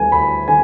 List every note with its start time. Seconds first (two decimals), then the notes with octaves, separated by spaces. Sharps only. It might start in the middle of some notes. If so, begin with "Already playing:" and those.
Already playing: D2 G3 G#5
0.12 D2 B5
0.48 D3 G#5